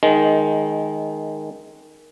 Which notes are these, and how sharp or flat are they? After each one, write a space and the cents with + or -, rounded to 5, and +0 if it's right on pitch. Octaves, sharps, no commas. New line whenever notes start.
D#3 +0 G#3 +10